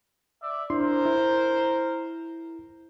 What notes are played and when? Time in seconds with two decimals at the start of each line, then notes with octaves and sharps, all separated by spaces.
0.41 D5 E5
0.70 D4 E4 A#4 C5 C6
1.05 E4